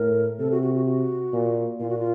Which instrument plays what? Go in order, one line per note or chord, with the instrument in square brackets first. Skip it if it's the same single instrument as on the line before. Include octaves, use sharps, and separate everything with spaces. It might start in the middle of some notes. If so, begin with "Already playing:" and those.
Already playing: [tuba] A2 [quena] A#4
[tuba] C3 [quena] A4
[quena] F#4
F#4
F#4
F#4
[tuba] A#2
[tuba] A#2 [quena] F4
[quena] F#4
F4